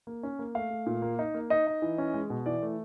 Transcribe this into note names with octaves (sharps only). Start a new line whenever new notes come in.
A#3
C#4
A#3
A3 F5
A3
A#2
A#3
D#4
A#3
D#4 D#5
D#4
E3
C#4
G#3
B2
E3 D5
A3